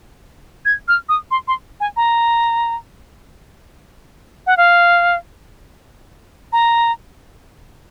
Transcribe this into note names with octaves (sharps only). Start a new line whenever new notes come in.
G#6
F6
D#6
C6
C6
G#5
A#5
F#5
F5
A#5